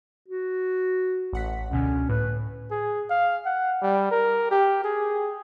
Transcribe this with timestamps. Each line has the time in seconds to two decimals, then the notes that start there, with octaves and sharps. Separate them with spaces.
0.28 F#4
1.33 A1 F#5 B6
1.71 C#2 B2 D3 C#4
2.10 A2 B4
2.71 G#4
3.10 F5
3.46 F#5
3.82 G3
4.12 A#4
4.51 G4
4.84 G#4